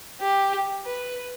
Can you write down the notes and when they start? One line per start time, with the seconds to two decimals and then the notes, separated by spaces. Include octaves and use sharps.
0.21 G4
0.86 B4